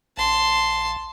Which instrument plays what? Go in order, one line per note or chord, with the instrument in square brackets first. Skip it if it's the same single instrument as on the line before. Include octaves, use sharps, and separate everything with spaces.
[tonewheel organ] A#1 [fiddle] A5 C6